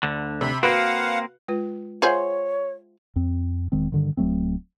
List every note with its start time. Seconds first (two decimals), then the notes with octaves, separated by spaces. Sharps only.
0.03 D2 D3
0.41 C3 B5
0.63 A#3 C4 F#4 B4 F5 F#5
1.48 G#3 F4 B4
2.02 F4 G#4 C5 C#5 E5 F#5 G#5
3.16 F2 C4
3.72 E1 D#3 G#3 C4
3.92 G2 D3 D#3
4.17 D1 F#3 A3 C4